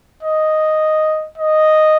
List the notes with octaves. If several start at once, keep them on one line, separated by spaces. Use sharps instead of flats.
D#5
D#5